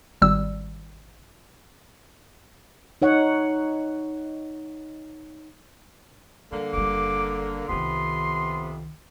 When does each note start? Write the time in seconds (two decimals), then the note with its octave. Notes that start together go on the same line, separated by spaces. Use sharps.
0.22 G#1 G3 E6
3.02 D#4 C#5 F#5
6.52 D3 G3 A#3
6.73 F#1 G3 D6
7.69 C2 F2 C3 D#3 B3 C6